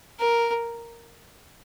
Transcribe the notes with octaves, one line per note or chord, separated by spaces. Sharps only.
A#4